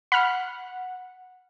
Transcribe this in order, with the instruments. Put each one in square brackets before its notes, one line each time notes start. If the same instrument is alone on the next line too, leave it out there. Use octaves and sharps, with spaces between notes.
[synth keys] F#5 [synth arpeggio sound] B5 F6